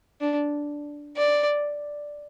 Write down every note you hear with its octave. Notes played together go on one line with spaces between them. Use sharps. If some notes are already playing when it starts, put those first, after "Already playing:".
D4
D5